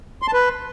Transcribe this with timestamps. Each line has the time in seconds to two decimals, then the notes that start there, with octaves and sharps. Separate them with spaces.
0.22 C6
0.28 A5
0.33 B4